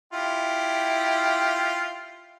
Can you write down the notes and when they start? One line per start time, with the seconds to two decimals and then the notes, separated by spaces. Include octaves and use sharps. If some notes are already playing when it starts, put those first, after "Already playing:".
0.13 E4 F4 G4